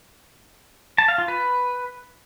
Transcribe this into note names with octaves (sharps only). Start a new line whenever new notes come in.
A5
F5
F4
B4